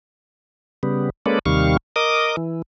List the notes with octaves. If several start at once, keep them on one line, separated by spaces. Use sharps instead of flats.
C#3 G3 B3
G#3 A#3 C#4 A4 B4 D5
D#2 C3 D#3 G3 F5 C#6
A#4 D#5 D6 D#6
E3